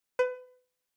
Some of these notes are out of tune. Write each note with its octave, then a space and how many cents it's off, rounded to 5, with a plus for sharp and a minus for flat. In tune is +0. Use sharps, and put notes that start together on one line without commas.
B4 +30